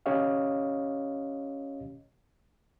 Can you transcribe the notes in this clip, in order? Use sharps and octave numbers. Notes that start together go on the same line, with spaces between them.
C#4 G4 C#5 D#5 F5